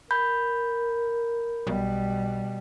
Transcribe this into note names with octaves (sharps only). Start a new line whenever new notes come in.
A#4 B5 G6
B1 B2 G3